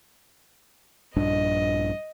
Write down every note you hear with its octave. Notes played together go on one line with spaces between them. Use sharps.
A#1 G2 D4 D#5